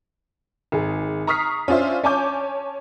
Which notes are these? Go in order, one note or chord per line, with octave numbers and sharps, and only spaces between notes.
G#1 G#4
A#5 C#6 D#6 F6 B6 C7
C#4 D4 F4 C5 E5
C#4 C#5 G#5 A5 D6 G6